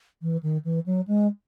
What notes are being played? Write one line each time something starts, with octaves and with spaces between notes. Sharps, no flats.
E3
D#3
E3
F#3
G#3